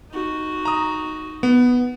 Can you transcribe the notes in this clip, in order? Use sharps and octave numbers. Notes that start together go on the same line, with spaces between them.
D#4 F#4
A#5 D#6
B3